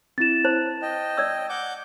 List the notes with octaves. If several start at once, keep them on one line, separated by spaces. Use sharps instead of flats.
C4 E4 A6 E7
C5 A5
D#5 G5
D5 E6
F#5 D6 G6